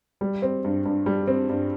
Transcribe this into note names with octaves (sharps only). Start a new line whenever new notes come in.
G3
C4
G2
G2
G3
C4
G2